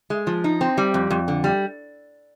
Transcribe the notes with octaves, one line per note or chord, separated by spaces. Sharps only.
G#3
F3
D#4
C4
G3
F2
F2
D3
G3